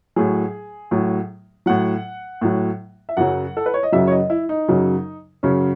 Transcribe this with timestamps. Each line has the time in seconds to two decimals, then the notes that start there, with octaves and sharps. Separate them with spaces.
0.16 A2 F#3 G#4
0.91 A2 F#3
1.66 A2 F#3 F#5
2.41 A2 F#3
3.09 E5
3.17 F#2 C#3 F#3 F#5
3.57 A4
3.66 B4
3.74 C#5
3.83 D#5
3.92 F#2 C#3 F#3 E5
4.07 C#5
4.11 D#5
4.30 E4
4.49 D#4
4.68 F#2 C#3 F#3
5.43 F#2 C#3 F#3 C#4